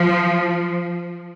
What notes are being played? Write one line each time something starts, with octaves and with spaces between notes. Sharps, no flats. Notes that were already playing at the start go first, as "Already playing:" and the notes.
Already playing: F3